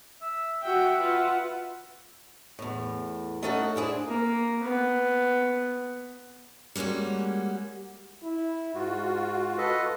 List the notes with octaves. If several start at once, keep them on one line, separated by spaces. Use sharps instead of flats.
E5
F#4 E5 F#5 G5
F4 B4 F#5
E2 A2
A3 C#4 D#4 A4 D#5 F#5
D4 E4 G#4 C5
A#3
B3
G3 G#3 A#3 C#4 F#4
E4
G#2 F4 F#4
A4 B4 D#5